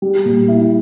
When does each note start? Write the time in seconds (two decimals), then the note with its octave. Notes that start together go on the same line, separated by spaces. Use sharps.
0.02 G3
0.25 A#2
0.48 E4